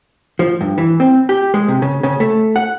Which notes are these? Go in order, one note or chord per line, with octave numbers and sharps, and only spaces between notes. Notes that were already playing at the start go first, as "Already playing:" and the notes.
F3
G2
E3
C4
G4
G#3
C3
C#3
C#3
A3
F#5